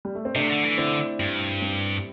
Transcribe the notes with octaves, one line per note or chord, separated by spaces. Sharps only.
G3
A3
C4
C3 A3 D4
D3
E3
D3 C4 E4
G2
G3 C4